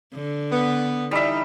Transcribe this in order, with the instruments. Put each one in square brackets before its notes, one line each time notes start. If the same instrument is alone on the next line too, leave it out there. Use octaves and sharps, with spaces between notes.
[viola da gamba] D3
[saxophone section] B3
[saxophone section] E3 D#4 [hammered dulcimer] G3 E5